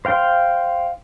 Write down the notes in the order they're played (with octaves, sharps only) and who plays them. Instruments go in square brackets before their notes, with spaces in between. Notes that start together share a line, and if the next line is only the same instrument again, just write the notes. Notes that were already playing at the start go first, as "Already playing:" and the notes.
[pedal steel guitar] C5 F5 G5 C6